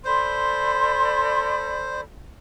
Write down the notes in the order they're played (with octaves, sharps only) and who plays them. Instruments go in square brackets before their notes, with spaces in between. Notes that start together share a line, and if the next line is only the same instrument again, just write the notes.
[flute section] A4 D5 B5 [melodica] C5 [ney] C6